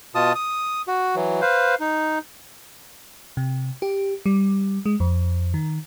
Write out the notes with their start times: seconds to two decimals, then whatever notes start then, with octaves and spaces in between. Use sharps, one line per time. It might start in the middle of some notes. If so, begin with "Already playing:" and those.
0.15 B2 F4 A5 D#6
0.35 D#6
0.88 F#4
1.16 E3 F#3
1.42 B4 C5 F5
1.80 D#4
3.37 C3
3.82 G4
4.26 G3
4.86 G#3
5.00 F2
5.54 D#3